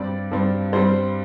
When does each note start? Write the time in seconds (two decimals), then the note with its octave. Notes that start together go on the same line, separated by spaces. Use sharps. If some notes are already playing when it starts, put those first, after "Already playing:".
Already playing: G2 G3 C4 D5
0.31 G2 G3 C4
0.72 G2 G3 C4 C5